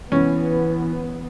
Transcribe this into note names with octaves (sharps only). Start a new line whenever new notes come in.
E3 B3 C#4